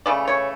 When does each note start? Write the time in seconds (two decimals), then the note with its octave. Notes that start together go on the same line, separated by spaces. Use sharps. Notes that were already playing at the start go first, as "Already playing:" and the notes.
0.06 C#3 E3 A3 D5
0.27 C#5